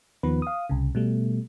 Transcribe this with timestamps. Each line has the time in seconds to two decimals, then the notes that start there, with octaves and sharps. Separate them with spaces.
0.23 D#2 D#3 F3 B3 B4
0.42 F5 D#6
0.69 C2 C#3
0.95 B2 G3 A3